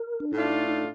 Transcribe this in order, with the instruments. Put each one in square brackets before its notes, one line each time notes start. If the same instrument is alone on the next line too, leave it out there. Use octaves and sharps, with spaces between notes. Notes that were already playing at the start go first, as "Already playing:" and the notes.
Already playing: [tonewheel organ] A#4
D4
[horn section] A2 A3 D4 F4 [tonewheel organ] D#4
[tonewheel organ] D#4
D#4